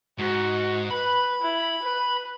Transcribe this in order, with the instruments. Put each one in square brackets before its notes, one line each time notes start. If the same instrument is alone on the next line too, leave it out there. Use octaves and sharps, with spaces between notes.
[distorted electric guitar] G#2 [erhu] F#4
[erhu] B4 [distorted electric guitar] B5
[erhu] E4
B4